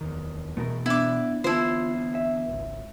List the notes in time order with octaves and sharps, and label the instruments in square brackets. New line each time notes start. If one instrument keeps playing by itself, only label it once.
[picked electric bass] D1 E2 D#3
[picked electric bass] B2 E3 [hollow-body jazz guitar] A3 A#4
[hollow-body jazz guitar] B3 D4 [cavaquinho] E4 D6
[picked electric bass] D3 E3 B3 [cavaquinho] E4 C5 [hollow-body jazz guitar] F4 A5
[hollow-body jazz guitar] E5
[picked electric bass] G#1 C#2